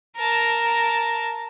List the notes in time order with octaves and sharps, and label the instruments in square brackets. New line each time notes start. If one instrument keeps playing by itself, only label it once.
[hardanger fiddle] A#4 A5